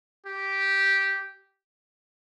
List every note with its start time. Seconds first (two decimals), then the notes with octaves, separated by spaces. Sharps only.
0.26 G4